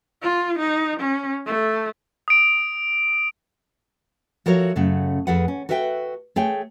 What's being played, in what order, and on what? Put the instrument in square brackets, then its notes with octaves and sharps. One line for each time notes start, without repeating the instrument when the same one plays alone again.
[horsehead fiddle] F4
D#4
C#4
A3
[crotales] D#6 D7
[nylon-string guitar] F3 F#4 A4 A#4 C#5 E5
F#2 C#3 A3 F#5
F2 G#4 A4 B4 F#5
C#4
F#4 A4 B4 E5 F5 G5
A3 G#4 C#5 G5